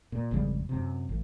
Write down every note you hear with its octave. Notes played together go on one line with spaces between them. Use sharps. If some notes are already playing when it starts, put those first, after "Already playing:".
A#2
G#1 F2 C#3 G3
F#2 C3
A1